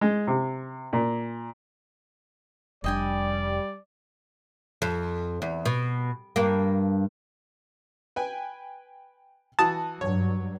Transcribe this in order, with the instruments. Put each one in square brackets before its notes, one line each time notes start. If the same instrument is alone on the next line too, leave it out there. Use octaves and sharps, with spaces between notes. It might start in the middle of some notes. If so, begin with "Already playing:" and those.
[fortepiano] G#3
C3
A#2
[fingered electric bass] F1 D4 [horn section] G3 [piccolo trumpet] D5 [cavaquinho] D#5 G5 G#5
[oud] F2
E2
B2
G2 A#3
[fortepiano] B4 G5 G#5
[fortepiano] E3 F#4 D#6 [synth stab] A5
[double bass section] G2 F#3 [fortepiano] C#5